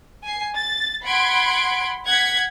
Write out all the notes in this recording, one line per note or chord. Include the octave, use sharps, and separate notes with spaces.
G#5 C7
A6
F#5 B5 C6 G#6 D7
F#5 G#6 B6